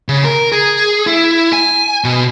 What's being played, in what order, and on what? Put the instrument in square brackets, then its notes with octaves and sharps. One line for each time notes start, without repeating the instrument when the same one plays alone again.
[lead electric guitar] C#3
A#4
G#4
E4
G#5
B2